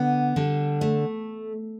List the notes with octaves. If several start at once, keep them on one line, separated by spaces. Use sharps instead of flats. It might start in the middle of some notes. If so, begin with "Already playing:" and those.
Already playing: D3 B3
D3 G3 D4
A3